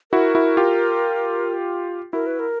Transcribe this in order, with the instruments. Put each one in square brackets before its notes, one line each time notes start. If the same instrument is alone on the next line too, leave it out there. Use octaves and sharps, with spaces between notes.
[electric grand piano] E4 F#4 [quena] A#4
[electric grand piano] E4 F#4
F4 G4
[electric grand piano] E4 F#4 [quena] A#4
[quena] B4
A#4